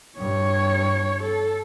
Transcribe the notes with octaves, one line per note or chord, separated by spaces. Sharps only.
G2 C#5
A4